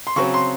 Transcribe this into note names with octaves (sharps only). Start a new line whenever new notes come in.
C6
C#3 F#3 C4 C#6
C6